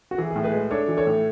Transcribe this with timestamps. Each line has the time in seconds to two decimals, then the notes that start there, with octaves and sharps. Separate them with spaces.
0.11 F#4
0.18 E3 G#4
0.31 A2 G#4
0.44 G#4 B4
0.53 G#3
0.71 D4 A4 C#5
0.88 E3
0.97 A4 C#5
1.07 A2